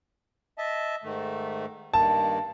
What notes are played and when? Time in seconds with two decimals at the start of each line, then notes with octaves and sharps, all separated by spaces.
0.58 D#5 E5 A5
1.04 G#2 D#3 A3
1.94 G2 D#3 A#3 A5